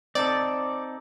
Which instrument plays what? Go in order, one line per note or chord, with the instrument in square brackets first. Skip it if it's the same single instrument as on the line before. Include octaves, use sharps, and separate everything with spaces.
[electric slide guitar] C4 D#4 A4 [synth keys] D5